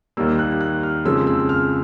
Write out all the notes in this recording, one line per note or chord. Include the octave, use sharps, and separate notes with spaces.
D#2 D#3 G3 A#3 E6
F#6
F#6
F6
F2 C#3 F3 G#3 E6
E6
F6